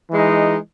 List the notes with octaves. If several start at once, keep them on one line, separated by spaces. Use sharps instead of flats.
E3 G#3 D#4